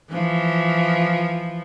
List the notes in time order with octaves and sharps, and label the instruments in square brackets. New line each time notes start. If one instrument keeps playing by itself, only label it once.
[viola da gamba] E3 F3